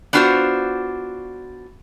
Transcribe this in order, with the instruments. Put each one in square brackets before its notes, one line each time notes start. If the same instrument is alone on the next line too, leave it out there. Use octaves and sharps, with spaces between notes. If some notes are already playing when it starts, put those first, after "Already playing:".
[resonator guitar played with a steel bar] B3 D4 F4 F#4 A4 C5